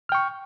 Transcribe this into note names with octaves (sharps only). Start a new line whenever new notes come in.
G5 C#6 F6